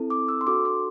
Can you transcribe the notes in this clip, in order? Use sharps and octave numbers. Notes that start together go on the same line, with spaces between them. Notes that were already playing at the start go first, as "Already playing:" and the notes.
Already playing: C4 E4 A4
D6
E6
C6
D4 F#4 A4 D6
C6